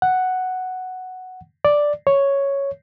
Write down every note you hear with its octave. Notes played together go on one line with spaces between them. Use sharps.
F#5
D5
C#5